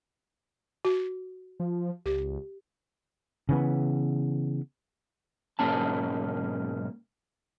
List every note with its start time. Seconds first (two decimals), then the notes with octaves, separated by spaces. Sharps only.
0.85 F#4
1.60 F3
2.06 C#2 G4
3.49 C#3 E3 B3
5.59 B1 G#2 A#3 C#4 A5